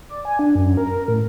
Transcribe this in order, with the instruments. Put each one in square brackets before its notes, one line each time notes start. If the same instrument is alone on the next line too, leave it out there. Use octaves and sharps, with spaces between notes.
[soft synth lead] D5
G#5
D4
F#2
A#4
A#4
A2